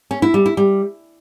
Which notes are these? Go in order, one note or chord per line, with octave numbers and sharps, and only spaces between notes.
C#4
E4
G3
E4
G3